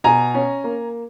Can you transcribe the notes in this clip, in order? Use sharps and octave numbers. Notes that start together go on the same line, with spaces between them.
B2 G#5 A#5
C#4
A#3